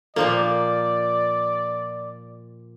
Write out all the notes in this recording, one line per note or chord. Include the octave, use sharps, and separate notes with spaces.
A#2 F3 A#3 A4 A#4 D5